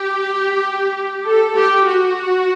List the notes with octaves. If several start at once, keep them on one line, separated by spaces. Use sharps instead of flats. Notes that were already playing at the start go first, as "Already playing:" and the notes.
Already playing: G4
A4
G4
F#4